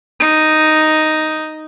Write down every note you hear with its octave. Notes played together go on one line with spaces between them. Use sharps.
D#4